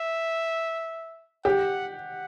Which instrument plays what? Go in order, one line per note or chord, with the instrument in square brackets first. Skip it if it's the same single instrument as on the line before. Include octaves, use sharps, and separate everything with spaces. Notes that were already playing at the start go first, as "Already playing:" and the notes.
Already playing: [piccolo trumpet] E5
[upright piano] G4 [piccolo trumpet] F#5
[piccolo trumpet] F#5